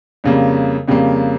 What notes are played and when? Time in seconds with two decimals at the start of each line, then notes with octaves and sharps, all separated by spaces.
0.24 F2 C#3 G3 A#3
0.88 F2 C#3 G3 A#3